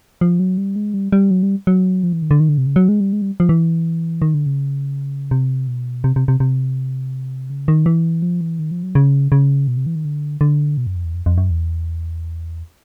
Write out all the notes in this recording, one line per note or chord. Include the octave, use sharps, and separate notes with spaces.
F3
F#3
G3
G#3
G3
G3
F#3
G3
F#3
F3
E3
D#3
D3
D#3
D3
C3
C#3
F#3
G#3
G3
G#3
G3
F3
E3
D#3
D3
C#3
C3
B2
C3
C3
C3
C3
C#3
D#3
E3
F3
E3
D#3
F3
F#3
C#3
C#3
B2
C3
E3
D#3
D3
D3
B2
F#2
F2
E2
F2
F2
F#2
E2